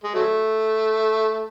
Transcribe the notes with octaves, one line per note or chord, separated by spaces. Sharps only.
G#3
F#3 A3